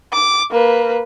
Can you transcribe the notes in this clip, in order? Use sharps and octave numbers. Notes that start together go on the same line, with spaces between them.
D6
A#3 B4